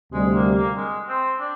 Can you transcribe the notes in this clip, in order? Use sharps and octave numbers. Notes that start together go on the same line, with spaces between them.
D2 C3 G3 G#3
A#3
A#3
G#3
C4
D4